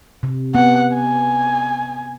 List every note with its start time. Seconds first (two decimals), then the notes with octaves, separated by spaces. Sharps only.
0.23 C3
0.55 B3 F#5
0.95 G#5